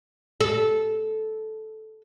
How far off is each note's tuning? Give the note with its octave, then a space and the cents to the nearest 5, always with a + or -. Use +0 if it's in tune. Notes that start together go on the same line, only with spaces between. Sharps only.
A4 -10